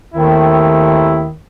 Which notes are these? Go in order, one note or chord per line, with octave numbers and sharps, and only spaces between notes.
D#2 D#3 A3 C4 E4